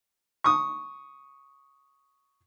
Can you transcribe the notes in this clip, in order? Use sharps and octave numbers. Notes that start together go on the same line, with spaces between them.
C#6 D#6